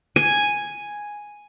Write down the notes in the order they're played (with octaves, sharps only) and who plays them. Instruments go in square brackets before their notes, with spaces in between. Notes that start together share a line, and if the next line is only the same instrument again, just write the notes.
[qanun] G#5